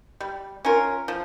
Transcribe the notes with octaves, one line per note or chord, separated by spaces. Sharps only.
G3
C#4 F4 A#4
F3